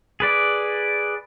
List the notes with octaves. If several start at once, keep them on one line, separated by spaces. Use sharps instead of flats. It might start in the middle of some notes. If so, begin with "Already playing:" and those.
G#4 B4 D5